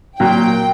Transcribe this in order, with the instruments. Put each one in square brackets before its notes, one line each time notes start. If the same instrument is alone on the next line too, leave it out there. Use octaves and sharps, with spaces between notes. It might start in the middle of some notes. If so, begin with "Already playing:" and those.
[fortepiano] A#2 F#3 A#3 [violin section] G5